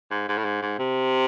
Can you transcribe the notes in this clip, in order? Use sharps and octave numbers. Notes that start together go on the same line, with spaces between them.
G#2
G#2
A2
G#2
G#2
C3